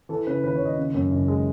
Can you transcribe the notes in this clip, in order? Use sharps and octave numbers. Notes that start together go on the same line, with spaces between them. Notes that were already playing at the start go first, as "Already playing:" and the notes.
E3 A4
C#3 B4
D#2 B4
C#5
D#2
D#5
C#3
F#2
F#1
G#3